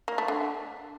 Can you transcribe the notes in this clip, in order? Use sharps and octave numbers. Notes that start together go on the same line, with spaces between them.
A#3
A3
D3